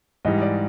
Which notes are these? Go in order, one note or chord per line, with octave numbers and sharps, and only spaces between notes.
G#2 E3 G3 D#5
D5